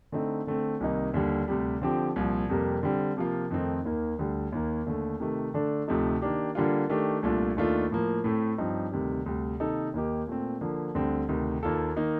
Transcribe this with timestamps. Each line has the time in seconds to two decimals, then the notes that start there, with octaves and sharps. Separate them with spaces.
0.12 D3 A3 C4 D#4
0.47 D3 A3 C4
0.80 C2 C3 D#3 A#3 D#4
1.14 D#2 D3 G3
1.48 D2 C3 G3
1.82 D3 F3 C4 G4
2.16 C2 A#2 F3
2.49 F2 C3 G3 A#3
2.83 D3 G3 C4
3.17 C3 F3 A#3 F4
3.51 F2 D#3 A3 C4 D#4
3.85 D#2 D#3 A#3
4.19 D2 D3 G3
4.52 D#2 D#3 A#3
4.86 D#2 D3 A3
5.20 C3 D#3 A3
5.54 D3 A3 D4 A4
5.88 D2 C3 F3 A3 D#4
6.22 D#3 A#3 D4 G4
6.55 D3 G3 A#3 D4 F4
6.89 D#3 A3 D4 G4
7.23 C2 A#2 A3 D4 F4
7.57 D#2 D#3 A3 D4 F4
7.91 A2 F3 A#3
8.24 A2 A3 C4
8.58 G2 F3 C4 D#4
8.92 D2 C3 D#3 G3
9.26 D2 C3 G3
9.60 C3 D#3 A#3 D#4 A4
9.94 D#2 D#3 A#3 D#4 G4
10.27 A#2 A3 C4
10.61 D3 F3 A#3
10.95 D2 D3 G3 C4
11.29 D2 C3 D#3
11.63 D#2 D#3 A#3 F4 A4
11.96 D#3 A#3 D#4